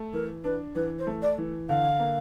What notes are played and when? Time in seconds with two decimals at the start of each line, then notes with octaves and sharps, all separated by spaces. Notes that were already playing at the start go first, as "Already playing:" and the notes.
Already playing: A3
0.13 E3 A#4
0.44 D4 B4
0.75 E3 B4
0.99 C5
1.07 A3
1.22 D5
1.38 E3
1.69 D3 F5
2.00 A#3